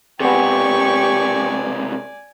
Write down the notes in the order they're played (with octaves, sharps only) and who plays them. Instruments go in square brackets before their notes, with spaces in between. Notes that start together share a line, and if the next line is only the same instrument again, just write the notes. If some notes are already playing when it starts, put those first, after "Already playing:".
[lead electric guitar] C#2 C3 [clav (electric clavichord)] B3 G#4 [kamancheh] G4 C#6 [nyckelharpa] D5 G#5